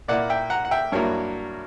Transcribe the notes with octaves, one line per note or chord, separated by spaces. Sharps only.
A#2 A#3 E4 D5 F#5
E5 G5
F#5 A#5
F#5
E5 G5
G2 F#3 A#3 E4 A#4 C#5